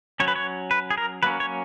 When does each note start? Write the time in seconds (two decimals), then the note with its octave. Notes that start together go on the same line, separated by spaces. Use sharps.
0.20 F#3 C#4 C#5
0.28 B4
0.35 C#5
0.71 B4
0.91 G#4
0.98 A#4
1.23 F#3 A#3 C#4 B4
1.40 C#5